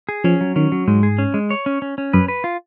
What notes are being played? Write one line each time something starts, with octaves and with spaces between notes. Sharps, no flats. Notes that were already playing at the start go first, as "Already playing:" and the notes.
G#4
F3 C#4
F#3
D#3 C#4
F#3
G#2 G#3
G#4
C#4
G#3
C#5
C#4
C#4
C#4
F#2 B4
B4
F4